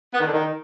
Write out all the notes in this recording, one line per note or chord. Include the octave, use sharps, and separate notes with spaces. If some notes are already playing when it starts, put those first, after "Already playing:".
B3
D#3
D3
D#3